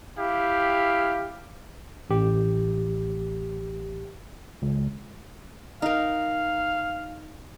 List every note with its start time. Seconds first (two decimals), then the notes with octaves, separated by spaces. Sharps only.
0.17 E4 G4 F5
2.10 A1 G4
4.62 C#2
5.82 D#4 A#4 F5